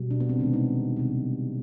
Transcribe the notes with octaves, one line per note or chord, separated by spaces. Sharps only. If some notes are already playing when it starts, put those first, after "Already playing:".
Already playing: B2 G3
D4
B3
C4
C3 D#3 G#3
D#4
C3 G3